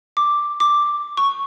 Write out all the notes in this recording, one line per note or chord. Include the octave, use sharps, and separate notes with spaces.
D6
D6
C#6